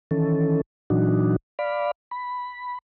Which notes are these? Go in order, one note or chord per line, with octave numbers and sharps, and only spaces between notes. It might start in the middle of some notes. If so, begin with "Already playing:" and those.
D#3 E3 C#4 A4
A#2 E3 F#3 D4 D#4 F#4
D5 F5 B5
B5